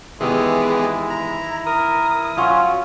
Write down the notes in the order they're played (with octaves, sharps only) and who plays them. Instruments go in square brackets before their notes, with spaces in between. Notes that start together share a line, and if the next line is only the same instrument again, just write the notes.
[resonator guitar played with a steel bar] D#3 E3 [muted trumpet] G#3 [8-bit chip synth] B3 G4 G#4 [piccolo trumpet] E4
[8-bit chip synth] A#5
[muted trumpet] A#4 [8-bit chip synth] D#6
[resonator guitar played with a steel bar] F#3 F4 F#4 [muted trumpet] C#4